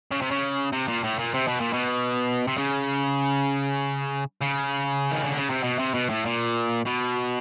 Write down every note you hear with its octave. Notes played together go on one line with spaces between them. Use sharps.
C#3
C3
C#3
C3
A#2
A2
A#2
C3
B2
A#2
B2
C3
C#3
C#3
D#3
D3
C#3
C3
B2
C3
B2
A2
A#2
B2